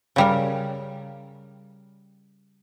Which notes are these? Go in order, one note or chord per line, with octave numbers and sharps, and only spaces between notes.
C#3 G3 A#4